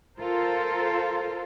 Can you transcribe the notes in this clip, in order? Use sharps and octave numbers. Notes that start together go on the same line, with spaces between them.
F4 A4 A#4 C5